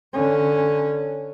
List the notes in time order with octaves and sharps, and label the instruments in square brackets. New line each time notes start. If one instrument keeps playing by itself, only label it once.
[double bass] D3 C#4